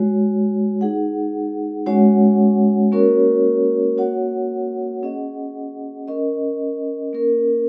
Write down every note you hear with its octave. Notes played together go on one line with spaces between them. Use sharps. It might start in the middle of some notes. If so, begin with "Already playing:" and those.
Already playing: G#3 F#4 C#5
D#4 G#4 F#5
G#3 C#4 F#4 C#5 F#5
A#3 C#4 F#4 A#4 C#5
A#3 F#4 C#5 F#5
C#4 G#4 D#5 F#5
C#4 A#4 D#5
A#3 C#4 A#4